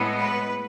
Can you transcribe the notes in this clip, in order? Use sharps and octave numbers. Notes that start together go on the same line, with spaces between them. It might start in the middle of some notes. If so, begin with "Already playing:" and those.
Already playing: A2 G#3 B3
B4